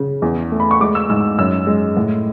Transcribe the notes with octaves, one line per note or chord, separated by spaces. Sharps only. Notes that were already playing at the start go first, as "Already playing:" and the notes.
Already playing: C#3
E2
A3
B5
C#6
G#3 D6
E6
G#2 E6
F#2 E6
G#3
A2